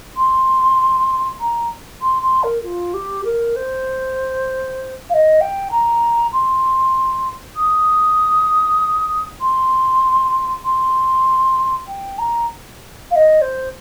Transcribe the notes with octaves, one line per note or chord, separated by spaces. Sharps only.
C6
A#5
C6
C6
A#4
F4
G4
A#4
C5
F5
D#5
G5
A#5
C6
D#6
C6
C6
G5
A#5
F5
D#5
C5